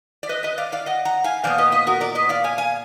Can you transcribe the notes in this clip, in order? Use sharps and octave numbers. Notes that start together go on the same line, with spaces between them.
D5
B4 D#5
B4 D#5
D5 F5
D5 F5
D#5 F#5
F#5 A#5
F5 G#5
A#2 F3 B3 D5 F5
B4 D#5
B4 D#5
F#4 A#4
A#4 D5
B4 D#5
D5 F5
F5 G#5
F5 G#5